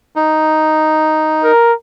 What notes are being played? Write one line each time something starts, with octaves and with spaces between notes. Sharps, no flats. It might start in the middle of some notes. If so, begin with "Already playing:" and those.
D#4
A#4